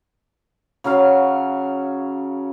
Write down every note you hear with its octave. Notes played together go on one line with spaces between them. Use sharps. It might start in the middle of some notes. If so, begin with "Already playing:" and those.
C#3 F#3 C#4 F5